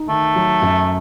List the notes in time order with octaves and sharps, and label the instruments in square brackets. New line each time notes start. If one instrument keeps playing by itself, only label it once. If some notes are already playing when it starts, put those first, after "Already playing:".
Already playing: [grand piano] D#4
[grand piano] D#3 [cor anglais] A3
[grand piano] F#3
F#2